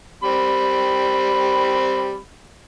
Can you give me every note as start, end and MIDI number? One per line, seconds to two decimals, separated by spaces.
0.23 2.17 55
0.23 2.17 60
0.23 2.17 83